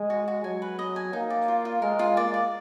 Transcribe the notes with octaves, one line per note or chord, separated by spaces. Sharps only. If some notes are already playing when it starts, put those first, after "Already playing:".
Already playing: G#3
F#4
F#4
F#3 G#5
B4
D#5
G#5
A#3 D#4
D5
F4
F4
G#3 A#4
F4
A#3 D5
D5